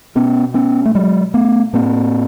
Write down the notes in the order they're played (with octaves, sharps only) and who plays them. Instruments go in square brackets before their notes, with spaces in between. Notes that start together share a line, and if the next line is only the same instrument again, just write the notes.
[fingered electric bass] B2 B3 C#4
B3 C#4
A3
F#3 G#3
A3 B3
A2 A#3 C4